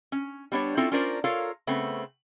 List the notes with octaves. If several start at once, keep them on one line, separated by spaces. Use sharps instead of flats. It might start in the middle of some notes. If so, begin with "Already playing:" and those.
C#4
G3 B3 D4 C#5
C4 C#4 E4 F4 A4
C#4 D4 F4 A#4 C5 D5
F4 A4 A#4 C#5 F5
C#3 A3 B3 C4